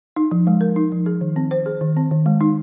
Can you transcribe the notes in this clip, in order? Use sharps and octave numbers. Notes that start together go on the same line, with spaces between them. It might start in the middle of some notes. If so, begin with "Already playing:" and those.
D#4
F3
G#3
A#4
D#4
F3
G#4
D#3
C4
C5
G#4
D#3
C4
D#3
G#3
D#4